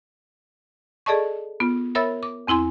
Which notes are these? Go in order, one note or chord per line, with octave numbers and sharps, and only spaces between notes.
G#4 A4 D5 D#5 A5 C#6
B3 F4
A#4 C#5 E5 B5 E6 A6
D6
E2 C4 E4 G#5 C6